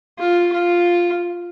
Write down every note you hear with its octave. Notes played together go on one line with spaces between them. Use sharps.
F4
F4